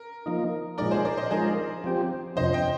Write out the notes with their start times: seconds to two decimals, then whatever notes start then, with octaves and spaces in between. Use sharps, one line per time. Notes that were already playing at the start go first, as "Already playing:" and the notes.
Already playing: A#4
0.26 F3 A#3 D#4
0.78 A#2 F3 G#3 D#4 A#4 D5
0.91 G#4 C5
1.05 A#4 D5
1.17 C5 D#5
1.31 F3 G#3 D#4 G#4 A#4 C5
1.84 F3 C4 G4
2.36 F2 C3 F3 C5 D#5
2.53 D#5 G5